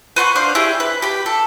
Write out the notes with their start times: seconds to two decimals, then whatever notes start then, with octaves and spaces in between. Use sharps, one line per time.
0.16 B4 C5 F#5 C#6
0.36 D4 C5 F5
0.55 E4 G4 G#4
0.80 B4
1.02 G4 B5
1.26 A4